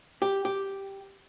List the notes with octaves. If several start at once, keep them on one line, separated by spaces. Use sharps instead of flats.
G4
G4